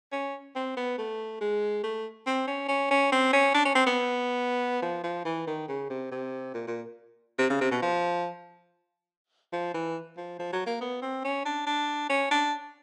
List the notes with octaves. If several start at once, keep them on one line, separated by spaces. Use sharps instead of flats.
C#4
C4
B3
A3
G#3
A3
C4
C#4
C#4
C#4
C4
C#4
D4
C#4
C4
B3
F3
F3
E3
D#3
C#3
C3
C3
A#2
A#2
C3
C#3
C3
B2
F3
F3
E3
F3
F3
F#3
A#3
B3
C4
C#4
D4
D4
C#4
D4